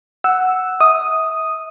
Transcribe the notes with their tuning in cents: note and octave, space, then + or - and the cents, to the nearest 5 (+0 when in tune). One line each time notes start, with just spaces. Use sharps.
F#5 +0 E6 +0
E5 -35 D#6 +0